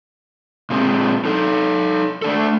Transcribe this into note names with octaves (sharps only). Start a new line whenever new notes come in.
A#2 G#3 C4
D#4 A4
A3 D4 A4